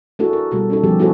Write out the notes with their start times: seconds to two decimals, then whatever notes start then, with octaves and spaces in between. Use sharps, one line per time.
0.19 A3 D4 E4 F#4 G#4 A4
0.33 A#4
0.51 B2 G3 A3 F#4 A4
0.70 C#4 D#4 A4
0.84 D#3 F3 G3 B3 G4 G#4
0.99 B3 E4 F#4 G#4 A4 C5